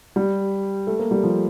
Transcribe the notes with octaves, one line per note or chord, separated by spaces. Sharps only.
G3
A3
A#3
G3
F3